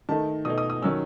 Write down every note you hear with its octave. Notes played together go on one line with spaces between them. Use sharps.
D#3 A3 D#4 A5
B2 A3 D#4 D#6
D#6
D#6
D#3 F#3 C#4 E6